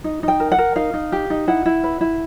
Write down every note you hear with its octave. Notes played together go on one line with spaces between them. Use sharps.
D#4
D#4
G5
A#4
F#5
A#4
D#4 F5
D#4
G4
D#4
E4 F#5
E4
B4
E4